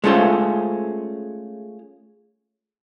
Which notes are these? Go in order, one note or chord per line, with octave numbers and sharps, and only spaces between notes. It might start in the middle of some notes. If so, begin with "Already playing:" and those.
G#3 A3 C#4 F4 C5